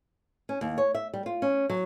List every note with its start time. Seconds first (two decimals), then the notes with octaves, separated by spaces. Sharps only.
0.49 C#4
0.61 D#2
0.78 C#5
0.95 E5
1.14 G3
1.26 F4
1.42 C#4
1.70 F#3